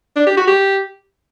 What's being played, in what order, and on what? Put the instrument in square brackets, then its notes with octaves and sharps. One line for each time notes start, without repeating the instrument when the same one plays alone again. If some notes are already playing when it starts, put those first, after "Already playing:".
[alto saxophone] D4
G4
F#4
G4